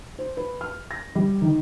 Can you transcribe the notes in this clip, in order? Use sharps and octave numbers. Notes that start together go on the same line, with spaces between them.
C5
B4
F6
A#6
G3
D#3